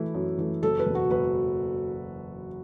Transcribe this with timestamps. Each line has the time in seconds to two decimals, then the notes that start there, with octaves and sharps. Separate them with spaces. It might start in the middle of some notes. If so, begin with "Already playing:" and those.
Already playing: E3 A3 E4
0.14 F#2
0.38 E3 A3
0.63 F#1 A4
0.79 B4
0.86 E2 B2
0.95 F#4
1.11 F#1 B4